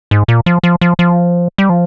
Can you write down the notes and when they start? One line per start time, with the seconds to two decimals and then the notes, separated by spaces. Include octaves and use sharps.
0.11 G#2
0.28 A#2
0.46 F3
0.63 F3
0.81 F3
0.99 F3
1.58 G3
1.70 F3